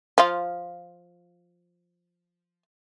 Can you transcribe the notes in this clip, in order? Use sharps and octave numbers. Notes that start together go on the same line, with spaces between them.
F3 F4